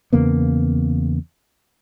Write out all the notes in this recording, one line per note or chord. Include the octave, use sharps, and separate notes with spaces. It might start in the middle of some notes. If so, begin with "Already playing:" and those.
E2 C#3 A#3 B3